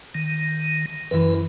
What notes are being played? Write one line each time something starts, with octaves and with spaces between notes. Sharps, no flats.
D#3
F#2 E3 B4